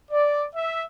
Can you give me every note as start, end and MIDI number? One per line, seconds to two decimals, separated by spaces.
0.11 0.43 74
0.55 0.84 76